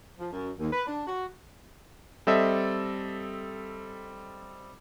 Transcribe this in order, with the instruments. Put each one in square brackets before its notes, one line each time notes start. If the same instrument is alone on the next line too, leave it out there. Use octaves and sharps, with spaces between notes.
[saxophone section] F3
F#2
D#2
B4
D4
F#4
[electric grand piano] G3 C4 A4 D#5 E5